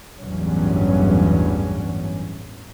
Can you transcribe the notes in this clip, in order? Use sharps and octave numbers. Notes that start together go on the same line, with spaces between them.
A1 E2 G2 F#3 C#4